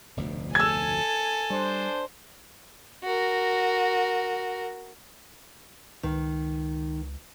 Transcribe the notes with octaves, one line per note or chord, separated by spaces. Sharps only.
F1 D2 B2
A4 G#5 E6 G#6
G3 D4 C5
F#4 A#4
C#2 D#3